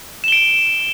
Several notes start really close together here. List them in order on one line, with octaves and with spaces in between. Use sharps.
E7 G7 D7